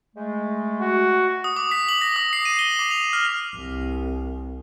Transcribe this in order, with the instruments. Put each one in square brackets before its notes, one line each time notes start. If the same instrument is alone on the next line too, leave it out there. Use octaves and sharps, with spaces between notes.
[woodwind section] G#3 A3
[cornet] F#4
[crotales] D#6
D6
B6
F#7
A#6
D#6
C7
D#7
G7
D6
F7
F6
[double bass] C2